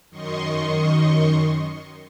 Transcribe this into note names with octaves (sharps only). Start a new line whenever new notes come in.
F#2 D#3 D#5 C6 C#6